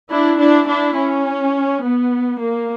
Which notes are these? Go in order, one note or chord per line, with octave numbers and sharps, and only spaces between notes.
D4 E4
D4 E4
D4 E4
C#4
B3
A#3